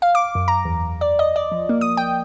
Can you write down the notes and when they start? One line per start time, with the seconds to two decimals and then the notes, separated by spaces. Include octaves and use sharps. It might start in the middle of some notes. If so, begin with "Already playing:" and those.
0.02 F5
0.15 D6
0.35 F#2
0.48 A#5
0.65 E2
1.01 D5
1.19 D#5
1.36 D5
1.51 F3
1.69 A#3
1.81 D#6
1.97 G5